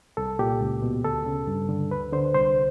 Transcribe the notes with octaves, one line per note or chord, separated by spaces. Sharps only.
C2 A4
A#2 G4
C#2
B2
D2 A4
C#3
G2
D3
D2 B4
D3 C5
C2 C5